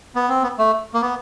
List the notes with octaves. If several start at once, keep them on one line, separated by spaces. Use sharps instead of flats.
B3
C4
B3
A3
A#3
B3